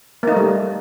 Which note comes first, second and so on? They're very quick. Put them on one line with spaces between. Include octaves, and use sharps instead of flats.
A#3 D#4 A3 G3